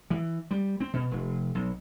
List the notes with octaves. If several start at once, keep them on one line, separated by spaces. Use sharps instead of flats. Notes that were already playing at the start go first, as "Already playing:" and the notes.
E3
G3
C4
B2
F1
B1